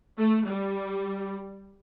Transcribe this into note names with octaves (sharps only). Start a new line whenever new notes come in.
A3
G3